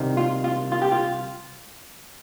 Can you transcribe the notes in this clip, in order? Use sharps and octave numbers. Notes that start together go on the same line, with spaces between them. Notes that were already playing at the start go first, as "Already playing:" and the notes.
Already playing: C2 C3 D#3
F4
F4
F4
G4
F4